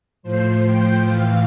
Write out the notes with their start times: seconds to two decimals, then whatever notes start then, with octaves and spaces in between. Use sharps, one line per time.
0.23 A2 F3 C5
0.66 G5
1.06 A2 E3 F5